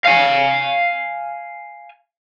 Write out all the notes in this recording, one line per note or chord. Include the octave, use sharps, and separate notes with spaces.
F5 G#5